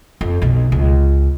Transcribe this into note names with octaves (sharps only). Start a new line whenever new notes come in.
F2
B1 B2
C#2